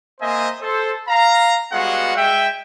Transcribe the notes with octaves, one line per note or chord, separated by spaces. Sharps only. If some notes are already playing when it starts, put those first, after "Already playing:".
A#3 C4 C5 D#5 E5 G#5
A4 C5
F5 A#5
G3 G#3 B3 F#4 F5 F#5
G#3 E5 G5